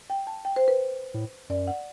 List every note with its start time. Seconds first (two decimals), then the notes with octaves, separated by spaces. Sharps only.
0.10 G5
0.27 A5
0.45 G5
0.56 C5
0.68 B4
1.14 A2
1.49 F#2 D5
1.67 F#5